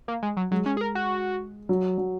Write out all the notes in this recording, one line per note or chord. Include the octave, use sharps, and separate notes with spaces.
A#3
G#3
F#3
F#3 G#3
C#4
G#4
A#4
F#4
F#3
F#3